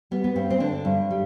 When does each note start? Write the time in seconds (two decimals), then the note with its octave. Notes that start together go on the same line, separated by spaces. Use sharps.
0.11 G3 B3
0.24 B3
0.35 G2 C4
0.50 C4
0.60 D3 D4
0.85 G2
1.11 G3